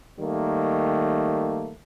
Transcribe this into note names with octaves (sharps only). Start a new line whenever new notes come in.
D#3 G3 A3 A#3